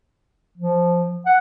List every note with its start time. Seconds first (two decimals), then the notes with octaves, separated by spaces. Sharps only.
0.58 F3
1.26 F#5